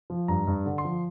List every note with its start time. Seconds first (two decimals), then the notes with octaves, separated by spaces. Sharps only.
0.10 F3
0.28 G2 A#5
0.47 G2
0.66 D3
0.78 C6
0.85 F3